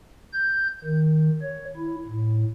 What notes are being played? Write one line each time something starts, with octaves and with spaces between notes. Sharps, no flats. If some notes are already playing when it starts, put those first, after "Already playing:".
G6
D#3
C#5
E4
A2